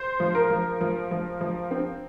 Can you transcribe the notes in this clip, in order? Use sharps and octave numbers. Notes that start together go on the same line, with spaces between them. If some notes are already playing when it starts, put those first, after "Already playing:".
Already playing: C5
F3
A#4
F3
F3
F3
F3
C4